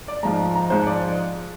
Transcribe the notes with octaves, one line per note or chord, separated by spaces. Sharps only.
D5
G#2 F3 G#3 A#5
A#5
G#2 F3 G#3 C5
D5